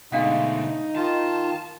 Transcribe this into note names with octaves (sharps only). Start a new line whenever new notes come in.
B2 D3 G#3 A3 D4 D#4 F5 F#5
D#3 F4 A5